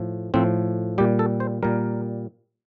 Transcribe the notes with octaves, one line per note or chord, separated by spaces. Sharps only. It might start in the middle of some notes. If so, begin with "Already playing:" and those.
Already playing: A2 F3
A2 F3 C4
A#2 G3 G4
A4
C5
A#2 G3 A#4